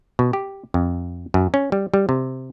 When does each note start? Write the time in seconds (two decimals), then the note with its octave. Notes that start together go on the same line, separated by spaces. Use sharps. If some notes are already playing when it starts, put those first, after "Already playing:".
0.19 B2
0.33 G4
0.74 F2
1.34 F#2
1.54 C#4
1.72 G3
1.94 G3
2.09 C3